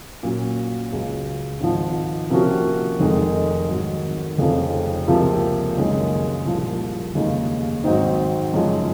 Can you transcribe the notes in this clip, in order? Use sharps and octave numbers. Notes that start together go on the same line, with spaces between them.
A#2 F#3 C#4
C#2 C#3 F#3
G#1 G#2 F3
C3 F3 A#3 C#4 F#4
F1 F2 D#3 G#3
G#1 G#2 D#3 F#3
F1 F2 C#3 F3 C4
C#2 C3 F3 A#3
F#1 F#2 D#3 G#3
C2 A#2 F3
F1 D#2 C#3 G#3 D#4
G#1 G#2 F#3 C4 D#4
F#1 F#2 F3 G#3